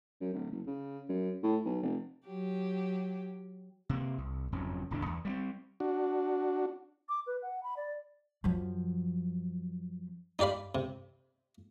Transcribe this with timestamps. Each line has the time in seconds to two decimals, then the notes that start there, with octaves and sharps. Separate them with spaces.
0.21 F#2
0.34 D1
0.51 F#1
0.67 C#3
1.09 F#2
1.43 A2
1.65 B1
1.83 F1
2.27 F#3 G4
3.89 C3 A#3
4.18 C2
4.52 F#1 F2 G#2 C#4
4.91 D1 E2 C#3 D4
5.06 E2
5.25 G3 A3 C4
5.80 D4 F#4
7.08 D6
7.27 B4
7.42 F#5
7.63 B5
7.77 D5
8.44 F#2 F3
10.39 D#4 G4 D5 F5 B5
10.75 C3